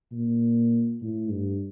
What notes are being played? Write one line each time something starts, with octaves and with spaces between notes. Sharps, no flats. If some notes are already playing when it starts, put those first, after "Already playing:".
A#2
A2
G2